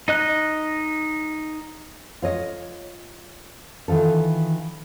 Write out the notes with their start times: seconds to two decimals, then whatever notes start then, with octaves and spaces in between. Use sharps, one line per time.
0.08 D#4 D#5 F#6
2.22 F4 C#5 D#5
3.88 D#3 E3 F4 A4